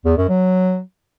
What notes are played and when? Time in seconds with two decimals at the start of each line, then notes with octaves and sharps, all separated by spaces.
0.05 E2
0.17 F#2
0.29 F#3